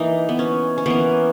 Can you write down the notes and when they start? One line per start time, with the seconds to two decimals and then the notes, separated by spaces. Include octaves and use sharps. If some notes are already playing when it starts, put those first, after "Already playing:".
Already playing: E3 A#3 D#4
0.29 B3
0.39 C#4
0.78 C#4
0.86 E3 A#3 B3